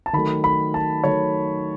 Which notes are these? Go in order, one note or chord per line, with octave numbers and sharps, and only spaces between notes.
A5
D#3 F#3 A3 B5
B5
A5
D#3 F#3 A3 C#5